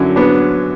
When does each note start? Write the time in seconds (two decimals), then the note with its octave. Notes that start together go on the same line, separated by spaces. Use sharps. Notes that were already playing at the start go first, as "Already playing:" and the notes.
Already playing: F#2 D3 F#3 C#4 E4
0.16 B3 D4